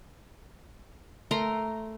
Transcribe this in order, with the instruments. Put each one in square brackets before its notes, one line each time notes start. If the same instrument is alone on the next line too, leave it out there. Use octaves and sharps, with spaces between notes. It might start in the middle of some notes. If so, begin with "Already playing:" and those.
[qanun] A3 A#4 A#5 C6